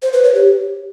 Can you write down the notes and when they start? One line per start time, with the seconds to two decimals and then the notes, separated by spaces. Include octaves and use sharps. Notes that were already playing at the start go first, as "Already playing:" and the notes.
0.02 C5
0.13 B4
0.24 C#5
0.35 G4